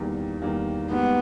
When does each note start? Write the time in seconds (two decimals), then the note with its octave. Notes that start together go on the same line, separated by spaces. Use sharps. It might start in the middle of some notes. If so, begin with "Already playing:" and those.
Already playing: E2 D#3 G3 A#3
0.42 E2 D#3 G3 A#3
0.91 G#2 G3 A#3 B3